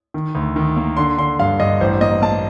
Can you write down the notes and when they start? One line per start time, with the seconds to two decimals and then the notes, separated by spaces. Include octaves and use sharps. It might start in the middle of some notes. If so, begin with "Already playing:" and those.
0.14 D#3
0.35 D2
0.56 D#3
0.76 A#3
0.97 D3 C6
1.18 D3 C6
1.39 G2 F5
1.60 G2 D#5
1.80 A1 C5
2.01 A#3 D#5
2.22 A#3 A5